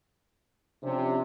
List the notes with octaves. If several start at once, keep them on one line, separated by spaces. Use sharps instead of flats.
C3 F3 C#4 D4